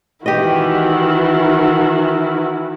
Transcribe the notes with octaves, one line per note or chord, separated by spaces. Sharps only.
D#3 E3 E4 F#4 G4 D#5